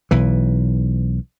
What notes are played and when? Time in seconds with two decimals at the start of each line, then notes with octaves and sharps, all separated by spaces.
0.11 B1 E3